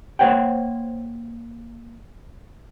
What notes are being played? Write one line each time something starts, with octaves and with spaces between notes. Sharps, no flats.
A#3 C5 C#5 F#5 G5